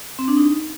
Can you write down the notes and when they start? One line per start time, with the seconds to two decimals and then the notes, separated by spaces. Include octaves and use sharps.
0.19 C4
0.28 D4
0.37 D#4